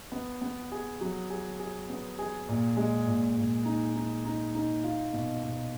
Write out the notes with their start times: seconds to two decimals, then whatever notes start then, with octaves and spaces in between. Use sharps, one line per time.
0.12 B3
0.42 B3
0.72 G#4
1.01 F#3
1.30 G#4
1.60 G#4
1.89 B3
2.19 G#4
2.49 A#2
2.77 G#3
3.07 A#2
3.37 A#2
3.65 D#4
3.95 D#4
4.25 D#4
4.55 D#4
4.84 F4
5.13 B2
5.43 B2